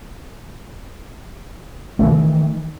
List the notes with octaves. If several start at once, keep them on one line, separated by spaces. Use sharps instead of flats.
D#3 E3 A3